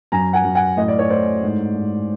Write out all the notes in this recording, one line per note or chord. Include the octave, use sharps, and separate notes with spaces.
F#2 G#5 A#5
F#5 G#5
F#2
F#5 G#5
A2 D#5
D5
C#5
A2 C5 D5
G#2
G#2